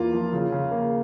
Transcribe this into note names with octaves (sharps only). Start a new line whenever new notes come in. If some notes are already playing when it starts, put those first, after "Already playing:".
Already playing: E2 A#3 F4
F3
C#3
C#3
A#3